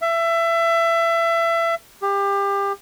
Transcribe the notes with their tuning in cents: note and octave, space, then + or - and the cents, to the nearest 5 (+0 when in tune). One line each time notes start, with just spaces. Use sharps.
E5 +25
G4 +25